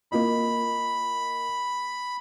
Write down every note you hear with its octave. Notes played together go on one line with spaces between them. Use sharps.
A#3 F4 D#5 B5